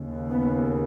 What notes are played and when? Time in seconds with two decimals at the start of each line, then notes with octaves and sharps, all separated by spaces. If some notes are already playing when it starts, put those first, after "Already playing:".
Already playing: D#2 C#3
0.30 B3